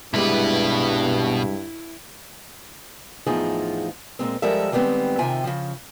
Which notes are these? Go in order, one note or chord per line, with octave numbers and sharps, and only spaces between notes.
C2 G2 B2 G#3 E4 G4 B4
E2 A2 F3 D#4 F4 G#4
A#2 G#3 C4
F3 G3 G#3 A4 A#4 E5
D#3 G3 G#3 B3 C4
C3 D#3 F4 E5 G5 G#5
C#3 F3